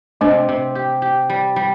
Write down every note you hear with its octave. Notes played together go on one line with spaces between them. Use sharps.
C3 A3 D4
C3
G4
G4
G3
G3